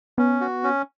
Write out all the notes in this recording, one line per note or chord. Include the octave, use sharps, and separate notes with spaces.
B3 C#4
F#4
C#4